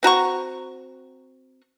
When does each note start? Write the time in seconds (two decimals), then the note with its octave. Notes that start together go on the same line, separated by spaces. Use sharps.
0.03 C4 F#4 A#5 C#6